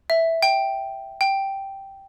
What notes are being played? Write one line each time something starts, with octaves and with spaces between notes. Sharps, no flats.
E5
G5
G5